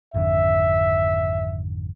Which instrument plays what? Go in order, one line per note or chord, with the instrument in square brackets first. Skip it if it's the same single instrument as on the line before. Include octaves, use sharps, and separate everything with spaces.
[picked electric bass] G#1 F2 D3 [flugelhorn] E5